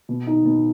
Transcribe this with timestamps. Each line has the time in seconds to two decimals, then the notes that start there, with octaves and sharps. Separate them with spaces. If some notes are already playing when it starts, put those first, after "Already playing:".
0.09 B2
0.27 D#4
0.45 B2